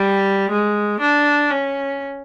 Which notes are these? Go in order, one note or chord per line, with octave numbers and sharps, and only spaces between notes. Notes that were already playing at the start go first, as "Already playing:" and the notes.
Already playing: G3
G#3
D4
C#4